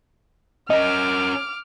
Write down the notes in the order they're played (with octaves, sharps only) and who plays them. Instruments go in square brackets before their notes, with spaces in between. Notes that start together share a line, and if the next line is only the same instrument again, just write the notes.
[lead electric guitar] C#4 A#4 [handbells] D#5 [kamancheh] D6 F6